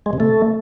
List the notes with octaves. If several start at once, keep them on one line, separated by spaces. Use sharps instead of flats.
G#3
C3
A3